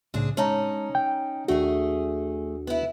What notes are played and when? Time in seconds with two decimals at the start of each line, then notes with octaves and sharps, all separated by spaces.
0.14 C2 A2 C#3 C4 D4 G#4
0.37 G#3 C#4 D#4 A5 A#5
0.95 G5
1.48 D#2 A3 D4 F#4 G#4
2.67 B3 E4